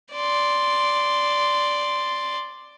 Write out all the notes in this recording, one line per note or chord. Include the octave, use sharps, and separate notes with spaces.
D5 C6